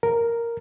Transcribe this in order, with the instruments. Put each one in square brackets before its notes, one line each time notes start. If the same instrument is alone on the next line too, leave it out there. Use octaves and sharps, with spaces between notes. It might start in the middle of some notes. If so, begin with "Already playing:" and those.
[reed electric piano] A#4